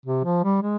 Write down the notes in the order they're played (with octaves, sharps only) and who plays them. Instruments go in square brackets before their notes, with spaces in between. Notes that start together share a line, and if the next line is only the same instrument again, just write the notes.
[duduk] C3
F3
G3
G#3